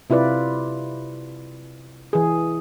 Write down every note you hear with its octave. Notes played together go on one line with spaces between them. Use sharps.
C3 E4 F4 B4 D5
E3 G#4